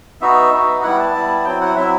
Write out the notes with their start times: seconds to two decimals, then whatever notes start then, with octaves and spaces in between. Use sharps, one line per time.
0.21 B3 D#4 F#4 E5
0.52 B3 D#4 F#4
0.83 G3 B3 E4 F#5
0.99 A5
1.15 G3 B3 E4
1.37 A5
1.45 F#3 C4 E4 G5
1.61 F#5
1.76 F#3 C4 E4 E5